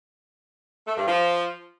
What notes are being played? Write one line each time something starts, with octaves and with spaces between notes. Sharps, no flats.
A3
G2
F3